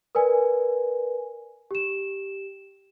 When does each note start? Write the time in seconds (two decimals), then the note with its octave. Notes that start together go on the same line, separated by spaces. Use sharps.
0.15 A#4 B4 D5 G#5
1.71 G4 E7